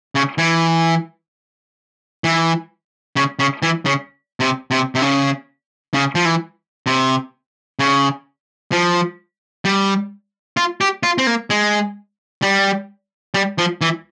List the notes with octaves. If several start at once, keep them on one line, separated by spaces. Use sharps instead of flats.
C#3
E3
E3
C#3
C#3
E3
C#3
C3
C3
C3
C#3
C#3
F3
E3
C3
C#3
F3
G3
F4
G4
F4
C4
A#3
G#3
G3
G3
F3
E3